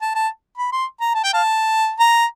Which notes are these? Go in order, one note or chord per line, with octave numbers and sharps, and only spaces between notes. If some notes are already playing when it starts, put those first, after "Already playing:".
A5
A5
B5
C6
A#5
A5
G5
F5 A5
A#5